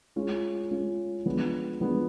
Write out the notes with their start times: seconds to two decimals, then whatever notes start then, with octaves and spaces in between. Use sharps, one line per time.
0.16 G#3 C#4 F4
0.71 G#3 C#4 F4
1.26 F3 G#3 B3 D4
1.81 F3 G#3 B3 D4